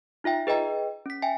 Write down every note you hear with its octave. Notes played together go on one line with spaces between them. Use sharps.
D#4 F4 E5 G5
G#4 B4 D#5 G5 A#5
C#4 B6
E5 G5 G#5